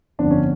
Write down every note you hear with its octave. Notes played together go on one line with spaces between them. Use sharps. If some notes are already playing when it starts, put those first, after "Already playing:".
G1 F2 D3 D4
C#4